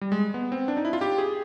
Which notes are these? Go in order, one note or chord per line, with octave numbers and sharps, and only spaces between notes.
G3
G#3
B3
C4
D4
D#4
E4
F4
G4
G#4